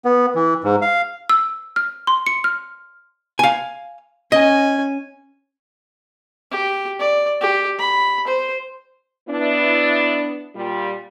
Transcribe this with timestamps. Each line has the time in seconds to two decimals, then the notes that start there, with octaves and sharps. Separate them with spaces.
0.05 B3
0.35 E3
0.64 G#2
0.82 F5
1.29 E6
1.76 F6
2.07 C6
2.27 C#7
2.44 F6
3.39 F5 G#5
4.32 C#4 D#5 G#5
6.51 G4
6.99 D5
7.41 G4
7.79 B5
8.27 C5
9.29 B3 D4 E4
10.56 A#2 G3 F4